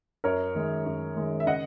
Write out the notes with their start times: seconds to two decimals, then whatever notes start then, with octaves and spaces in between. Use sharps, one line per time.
0.24 F#2 A#4 C#5
0.55 D#3 G#3
0.86 F#2
1.17 D#3 G#3
1.40 E5
1.46 C#3 D#5 F#5